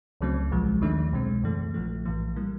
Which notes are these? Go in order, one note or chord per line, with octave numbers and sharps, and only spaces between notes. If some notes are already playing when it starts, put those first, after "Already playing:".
C#2 C#3 F#3 A3 C4
A#1 A#2 F3 G#3
D#2 D#3 F#3 A3 D4
C2 B2 G#3 C4
F#2 C#3 E3 A3
A#1 A#2 F3 A3
A#1 A2 E3 A3
A2 E3 G3 A#3